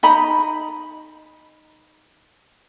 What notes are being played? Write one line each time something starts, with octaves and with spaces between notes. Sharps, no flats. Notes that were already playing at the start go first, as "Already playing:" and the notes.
D#4 D#5 A#5 B5